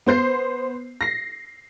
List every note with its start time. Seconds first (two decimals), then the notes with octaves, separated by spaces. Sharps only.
0.06 B3 C5 G6 C7
1.01 A#6 C7